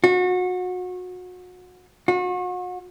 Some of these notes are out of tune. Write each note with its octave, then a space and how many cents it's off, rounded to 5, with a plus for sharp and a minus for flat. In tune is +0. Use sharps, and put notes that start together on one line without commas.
F#4 -30
F#4 -40